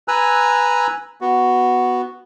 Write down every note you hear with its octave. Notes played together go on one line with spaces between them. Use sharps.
B4 G#5 A#5 E6 F#6
B3 F#4